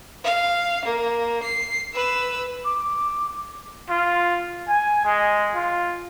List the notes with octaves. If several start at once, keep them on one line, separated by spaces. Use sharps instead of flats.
F5
A#3
C7
B4 E6
D6
F4
G#5
G#3
F4